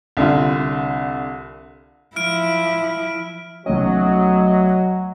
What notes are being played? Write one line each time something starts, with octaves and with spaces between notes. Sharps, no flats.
C2 D3 F4
F3 E4 F6 D7
B1 F#3 A3 C#4 D#5